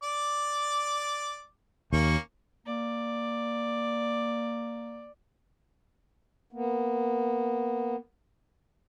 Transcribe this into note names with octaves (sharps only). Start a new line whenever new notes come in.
D5 D6
D#2 A#3 C#4 C#6
A#3 D5
A#3 B3